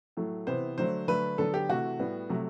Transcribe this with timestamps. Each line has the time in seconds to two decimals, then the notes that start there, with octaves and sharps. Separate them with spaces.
0.17 A2 F#3 A3
0.47 C3 E3 B3 C5
0.78 D3 F#3 A3 C5
1.08 D3 F#3 A3 B4
1.38 D3 F#3 B3 A4
1.54 G4
1.69 C3 E3 A3 F#4
1.99 A2 G3 B3
2.29 C3 F#3 A3